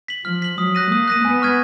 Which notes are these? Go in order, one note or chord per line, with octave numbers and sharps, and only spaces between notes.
B6 F#7
F3 F6
B6 F#7
F#3 D#6
F#6 A#6 D#7
A#3 D#6
F#6 A#6 D#7
B3 G#5
C#6 F6 G#6 D#7